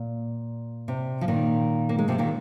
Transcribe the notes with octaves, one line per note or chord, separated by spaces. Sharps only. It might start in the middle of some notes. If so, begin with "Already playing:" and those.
Already playing: A#2
C3
F3
A#2 D#3
A#3
G#3
C3 F3
A#2 D#3